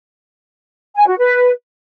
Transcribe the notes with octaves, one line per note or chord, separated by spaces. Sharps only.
G#5
F#4
B4